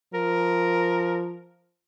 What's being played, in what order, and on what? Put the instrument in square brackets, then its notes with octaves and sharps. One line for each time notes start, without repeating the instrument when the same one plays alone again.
[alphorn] F3 [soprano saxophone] A#4